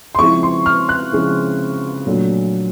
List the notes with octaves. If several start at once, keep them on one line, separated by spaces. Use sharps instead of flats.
C6
C#3 F3 G#3 C4 E4 C#6
C6
F6
F#6
C#3 F3 G#3 C4 E4
A#2 F#3 A3 D4